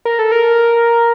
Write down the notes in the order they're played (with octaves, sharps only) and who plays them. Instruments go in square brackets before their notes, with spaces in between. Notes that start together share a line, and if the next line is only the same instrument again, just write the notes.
[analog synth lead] A#4
A4
A#4